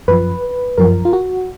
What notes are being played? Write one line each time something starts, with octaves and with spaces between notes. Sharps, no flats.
F#2 F3 B4
F#2 F3 A#4
F4
F#4